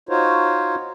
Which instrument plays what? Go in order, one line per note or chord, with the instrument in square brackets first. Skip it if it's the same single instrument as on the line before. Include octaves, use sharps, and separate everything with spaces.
[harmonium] D#4 F4 F#4 C5 C#5